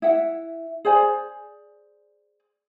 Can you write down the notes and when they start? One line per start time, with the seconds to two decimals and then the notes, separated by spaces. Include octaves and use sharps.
0.02 E4 E5 F#5
0.85 G#4 C5 D5 G#5